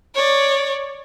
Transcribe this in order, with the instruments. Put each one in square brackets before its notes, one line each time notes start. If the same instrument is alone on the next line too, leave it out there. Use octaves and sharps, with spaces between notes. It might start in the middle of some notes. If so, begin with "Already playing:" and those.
[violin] C#5 D5